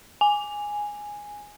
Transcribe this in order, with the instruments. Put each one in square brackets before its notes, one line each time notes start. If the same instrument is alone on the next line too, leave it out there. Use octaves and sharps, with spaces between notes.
[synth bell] G#5